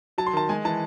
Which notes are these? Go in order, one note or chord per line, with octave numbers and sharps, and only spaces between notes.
F#3 A5
C6
D#3 A5
G#3 G#5
E3 A5